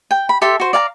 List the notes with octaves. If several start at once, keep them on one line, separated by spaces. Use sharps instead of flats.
G5
B5
G4 A4 E5 C6
F#4 C5
D5 F5 A5 A#5